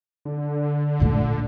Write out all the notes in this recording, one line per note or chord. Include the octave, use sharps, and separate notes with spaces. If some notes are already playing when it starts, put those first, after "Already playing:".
D3
A#2 A3